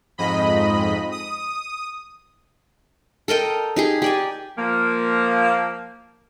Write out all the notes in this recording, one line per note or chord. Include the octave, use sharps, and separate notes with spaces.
F2 G#2 D#5 B5
D#6
A4 A#4 D#5 G5
D#4 G4 G#4
G4 D5 G#5
F3 A#3